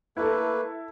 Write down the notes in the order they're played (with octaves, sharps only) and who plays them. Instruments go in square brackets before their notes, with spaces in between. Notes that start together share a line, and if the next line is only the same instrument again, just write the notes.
[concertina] A3 A#3 B4 [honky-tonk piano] E4 A4